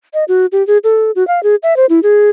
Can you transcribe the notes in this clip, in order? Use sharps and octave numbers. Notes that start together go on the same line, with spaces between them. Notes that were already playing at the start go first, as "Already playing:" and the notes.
D#5
F#4
G4
G#4
A4
F#4
F5
G#4
E5
C5
E4
G#4